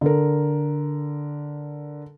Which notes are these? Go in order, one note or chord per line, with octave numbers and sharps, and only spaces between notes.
D3 A#4